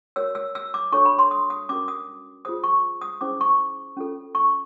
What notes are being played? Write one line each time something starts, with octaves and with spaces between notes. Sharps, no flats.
F#4 A#4 C#5 E6
E6
E6
D6
D4 F#4 A4 C#5 C#6
B5
C6
D#6
D#6
C#4 F#4 A#4 D6
D#6
F4 G#4 C5 D#6
C#6
D#6
C#4 E4 G#4 C5 D6
C#6
C#4 F4 A4
C#6